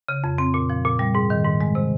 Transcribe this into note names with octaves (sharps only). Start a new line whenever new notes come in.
C#3
F2
C4
A#2
F3
A#2
G3
G#2
D#3
G#2
G#3
C3